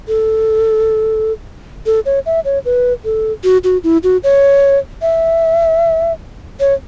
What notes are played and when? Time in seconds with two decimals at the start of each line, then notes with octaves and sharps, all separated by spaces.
0.08 A4
1.86 A4
2.06 C#5
2.26 E5
2.45 C#5
2.65 B4
3.05 A4
3.44 F#4
3.64 F#4
3.84 E4
4.03 F#4
4.24 C#5
5.02 E5
6.60 C#5